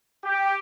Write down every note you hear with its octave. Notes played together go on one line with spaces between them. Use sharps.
G4